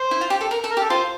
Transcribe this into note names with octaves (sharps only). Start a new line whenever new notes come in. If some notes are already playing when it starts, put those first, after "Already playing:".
Already playing: C5
E4
F4
G4
A4
A#4
A4
A#4
G4
A4
F4 C5